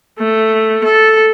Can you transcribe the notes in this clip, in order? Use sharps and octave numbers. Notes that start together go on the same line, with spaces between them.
A3
A4